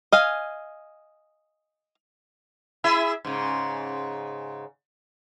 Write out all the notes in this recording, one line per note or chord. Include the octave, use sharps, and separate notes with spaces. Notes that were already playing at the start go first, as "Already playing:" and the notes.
D#5 F5 G#5
E4 G#4 E5
G#2 C#3